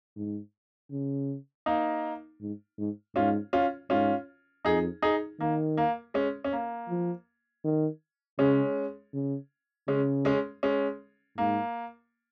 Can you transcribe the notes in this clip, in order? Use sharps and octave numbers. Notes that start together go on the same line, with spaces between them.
G#2
C#3
A#3 D#4
G#2
G#2
G#2 C#4 F4
C#4 F4
G#2 C#4 F4
F2 D#4 G#4
D#4 G#4
D#3 A#3
A#3
G#3 C#4
C#4
A#3
F3
D#3
C#3 G#3 C#4
C#3
C#3 G#3 C#4
G#3 C#4
G#3 C#4
G#2 A#3